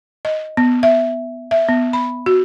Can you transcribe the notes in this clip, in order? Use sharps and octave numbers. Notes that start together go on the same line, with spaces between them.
D#5
B3
E5
E5
B3
B5
F#4